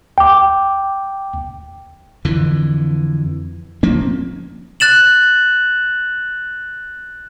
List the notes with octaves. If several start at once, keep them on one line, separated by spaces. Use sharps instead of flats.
G5 D6
F2 D3 E3
F3 A#3 C4 C#4
F#6 A6 E7 F#7